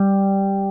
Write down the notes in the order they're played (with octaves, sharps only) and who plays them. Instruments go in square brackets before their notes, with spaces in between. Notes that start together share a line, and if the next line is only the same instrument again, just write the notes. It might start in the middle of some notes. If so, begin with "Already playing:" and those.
Already playing: [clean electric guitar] G3